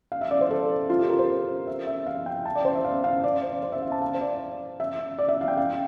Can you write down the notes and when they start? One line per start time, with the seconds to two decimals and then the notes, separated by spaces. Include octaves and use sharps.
0.12 F5
0.21 E5
0.31 D5
0.41 C5
0.51 A4
0.90 F4
0.99 G4
1.09 A#4
1.19 C5
1.67 E5
1.87 E5
2.07 F5
2.26 G5
2.46 A5
2.55 D5
2.65 C5
2.75 E5
2.85 F5
3.04 F5
3.24 D5
3.43 C5
3.63 C5
3.72 E5
3.82 F5
3.92 A5
4.02 F5
4.14 C5
4.21 D5
4.80 E5
5.19 D5
5.29 E5
5.41 F5
5.48 G5
5.57 F5